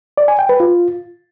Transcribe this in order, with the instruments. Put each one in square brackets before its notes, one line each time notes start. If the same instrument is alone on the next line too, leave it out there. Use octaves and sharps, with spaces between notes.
[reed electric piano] D5
G#5
G5
B4
F4